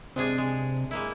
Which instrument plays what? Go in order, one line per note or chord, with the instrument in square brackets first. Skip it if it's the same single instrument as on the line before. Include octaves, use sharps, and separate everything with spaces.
[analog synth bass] C3 [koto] G#3 D4 G#4
[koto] G#3
G#3 A#3 E4